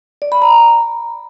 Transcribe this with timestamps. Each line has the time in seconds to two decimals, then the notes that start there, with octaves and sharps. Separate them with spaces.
0.22 D5
0.32 B5
0.42 A#5